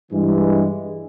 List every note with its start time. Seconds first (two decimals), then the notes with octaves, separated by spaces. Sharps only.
0.11 G2 E3 G#3